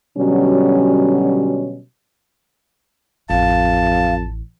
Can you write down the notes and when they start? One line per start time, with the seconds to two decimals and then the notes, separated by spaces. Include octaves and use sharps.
0.18 B2 D3 F#3 G3 C#4
3.30 A1 F2 F5 A5